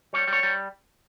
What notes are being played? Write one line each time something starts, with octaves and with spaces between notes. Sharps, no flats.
G3 C#5
G3
C#5
G3